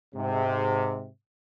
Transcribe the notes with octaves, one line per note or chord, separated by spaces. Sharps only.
G#2 C3